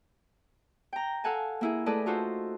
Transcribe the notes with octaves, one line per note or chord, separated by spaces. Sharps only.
G5 A#5
A4 F5 F#5 G#5 A5
A#3 E4 G#4
A3 G#4 A4 B4 D5 D#5
D#4 F4 F#4 A4 C5